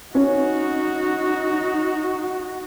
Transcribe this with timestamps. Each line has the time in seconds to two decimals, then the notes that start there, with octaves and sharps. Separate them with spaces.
0.15 C#4 D#4 F#4